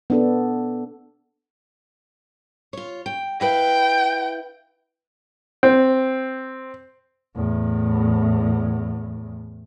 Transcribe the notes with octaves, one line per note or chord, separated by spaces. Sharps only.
B3 D4 A4
F4 C#5
G5
E4 B4 F5 G5
C4
E2 A2